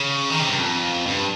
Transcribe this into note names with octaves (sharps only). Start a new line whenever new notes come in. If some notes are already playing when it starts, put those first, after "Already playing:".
Already playing: C#3
D#3
C3
G2
F2
G2